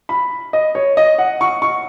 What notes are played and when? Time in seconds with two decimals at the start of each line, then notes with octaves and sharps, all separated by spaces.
0.09 B5
0.53 D#5
0.75 C#5
0.97 D#5
1.18 F#5
1.41 C#6
1.62 C#6